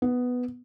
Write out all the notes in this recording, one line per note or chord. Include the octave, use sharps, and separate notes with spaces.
B3